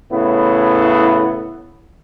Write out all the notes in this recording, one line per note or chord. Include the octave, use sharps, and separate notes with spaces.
A2 C#3 B3 E4